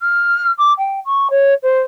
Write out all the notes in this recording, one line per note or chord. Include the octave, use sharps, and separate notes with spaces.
F6
D6
G5
C#6
C#5
C5